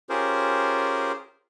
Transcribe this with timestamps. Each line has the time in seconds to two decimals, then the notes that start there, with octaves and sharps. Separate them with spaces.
0.09 C#4 F4 G4 G#4 A#4 C5